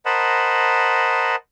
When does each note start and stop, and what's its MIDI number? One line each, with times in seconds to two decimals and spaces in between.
0.05 1.36 70
0.05 1.36 72
0.05 1.36 75
0.05 1.36 78
0.05 1.36 81
0.05 1.36 83